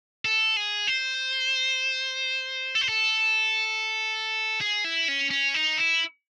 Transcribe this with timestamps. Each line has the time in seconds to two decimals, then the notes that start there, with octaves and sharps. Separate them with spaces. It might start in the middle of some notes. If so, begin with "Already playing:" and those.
0.25 A4
0.57 G#4
0.87 C5
2.75 A4
2.81 C5
2.89 A4
4.61 G#4
4.84 E4
5.08 C#4
5.31 C#4
5.54 D#4
5.77 E4